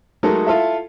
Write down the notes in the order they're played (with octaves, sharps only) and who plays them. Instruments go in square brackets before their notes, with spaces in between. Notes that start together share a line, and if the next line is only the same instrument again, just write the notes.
[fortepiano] F#3 G#3 A3 D#4 A4 A#4
E4 F4 A4 E5